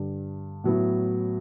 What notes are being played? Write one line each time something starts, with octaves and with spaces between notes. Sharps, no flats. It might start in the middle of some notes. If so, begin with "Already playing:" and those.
Already playing: G2 D3 G3
A2 F#3 B3 E4